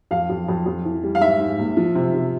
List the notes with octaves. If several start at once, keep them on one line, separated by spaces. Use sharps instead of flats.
F2 F5
F2
F2
F2
E3
G3
F5
G#2 E5
G#2
A#1
F3
C3
C3